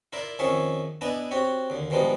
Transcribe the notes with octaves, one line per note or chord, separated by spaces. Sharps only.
E4 F4 A#4 D5 E5
F2 D#3 C#4 G#4 E5 C#6
B3 D4 E4 D5 D#5 G#5
C4 F#4 G4 C#5
D#2 D3
G2 B2 F3 G3 G#3 D#4